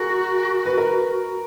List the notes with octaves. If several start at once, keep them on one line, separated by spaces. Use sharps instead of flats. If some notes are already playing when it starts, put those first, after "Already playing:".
Already playing: F#4 G#4 A#4
B4
A#4